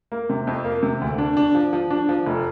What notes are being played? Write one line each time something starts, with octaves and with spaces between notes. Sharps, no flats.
A#3
C3
F2
A#3
C3
D2
D4
D4
F3
F3
D4
F3
F1